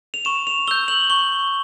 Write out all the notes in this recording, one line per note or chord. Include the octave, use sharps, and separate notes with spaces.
F7
C#6 E7
F7
E6 G6 G7
F#7
C#6 G7